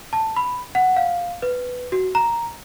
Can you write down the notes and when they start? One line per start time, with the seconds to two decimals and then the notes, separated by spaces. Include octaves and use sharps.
0.13 A5
0.36 B5
0.75 F#5
0.97 F5
1.42 B4
1.92 F#4
2.15 A#5